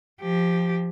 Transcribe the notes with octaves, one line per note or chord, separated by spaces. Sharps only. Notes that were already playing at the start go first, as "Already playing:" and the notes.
F3 G4